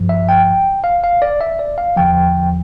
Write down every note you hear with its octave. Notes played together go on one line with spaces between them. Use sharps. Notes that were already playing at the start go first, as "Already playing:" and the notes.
Already playing: G2 F3
E5
G5
F5
F5
D5
E5
D5
F5
E2 D3 F3 G5